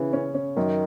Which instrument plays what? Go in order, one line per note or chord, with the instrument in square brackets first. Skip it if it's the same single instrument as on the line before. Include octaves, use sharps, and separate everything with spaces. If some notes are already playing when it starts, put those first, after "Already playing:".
Already playing: [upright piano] C#3 C#4 [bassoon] E3
[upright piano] C#4
C#4
[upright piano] F#2 [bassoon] D#3